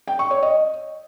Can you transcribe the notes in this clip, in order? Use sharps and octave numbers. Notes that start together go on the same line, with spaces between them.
G5
C#6
C#5
D#5